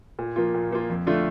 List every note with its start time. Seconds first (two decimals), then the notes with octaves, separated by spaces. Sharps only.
0.19 A#2
0.36 F3 A#3 F4
0.54 A#2
0.71 F3 A#3 F4
0.89 F2
1.07 D3 A3 D4 F4